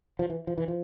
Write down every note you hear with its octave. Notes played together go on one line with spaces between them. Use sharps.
F3
E3
F3
E3
F3